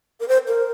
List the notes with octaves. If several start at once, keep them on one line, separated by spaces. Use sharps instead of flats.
A#4
C5
A#4